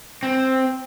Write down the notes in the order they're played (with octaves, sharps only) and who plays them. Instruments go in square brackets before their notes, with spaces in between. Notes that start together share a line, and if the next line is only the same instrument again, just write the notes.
[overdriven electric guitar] C4